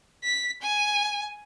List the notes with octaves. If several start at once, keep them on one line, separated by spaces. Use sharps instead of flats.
B6
G#5